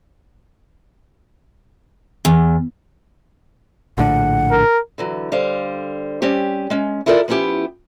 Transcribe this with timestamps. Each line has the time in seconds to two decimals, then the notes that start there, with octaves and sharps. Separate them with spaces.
2.25 E2
3.98 A#1 A2 D3 F#5
4.51 A#4
4.98 D3 E3 F#3
5.32 D3 G3 C5 F5
6.22 G3 C4 C#4 G4
6.70 G#3 C#4
7.06 E4 F4 A4 A#4 D5
7.28 F3 B3 C#4 E4 G4